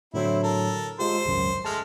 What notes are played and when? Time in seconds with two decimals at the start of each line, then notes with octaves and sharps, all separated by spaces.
0.14 A2 D3 F#3 C4 E4
0.43 A4 A#4
0.99 G#3 F4 G4 C5
1.25 G#1 C#2 F#2
1.65 G#3 A3 A5 F6